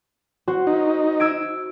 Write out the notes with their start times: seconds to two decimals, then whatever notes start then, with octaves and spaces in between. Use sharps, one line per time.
0.48 F#4 C5
0.67 D#4
1.20 E6 G#6 D7